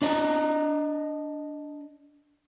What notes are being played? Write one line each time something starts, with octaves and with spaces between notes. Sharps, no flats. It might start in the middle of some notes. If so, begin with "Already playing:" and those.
D4 D5 D#5 A#5